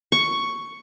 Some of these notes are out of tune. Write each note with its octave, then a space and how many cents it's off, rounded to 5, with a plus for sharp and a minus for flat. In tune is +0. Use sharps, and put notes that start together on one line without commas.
C#6 +5